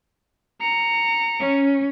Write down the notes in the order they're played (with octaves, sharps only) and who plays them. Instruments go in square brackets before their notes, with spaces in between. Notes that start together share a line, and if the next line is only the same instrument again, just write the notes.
[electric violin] A#5 C#7
[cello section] C#4